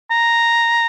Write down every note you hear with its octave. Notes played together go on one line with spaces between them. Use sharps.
A#5